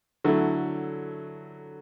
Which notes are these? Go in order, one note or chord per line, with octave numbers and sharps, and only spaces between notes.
D3 F#3 A3 E4